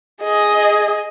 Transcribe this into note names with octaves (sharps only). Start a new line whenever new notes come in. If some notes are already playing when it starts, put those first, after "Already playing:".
G#4 D#5